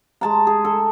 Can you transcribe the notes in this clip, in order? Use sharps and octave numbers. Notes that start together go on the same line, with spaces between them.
G#3 A5 A#5
G#4
A4